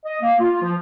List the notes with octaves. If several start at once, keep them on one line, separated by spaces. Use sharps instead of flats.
D#5
A#3
F4
F3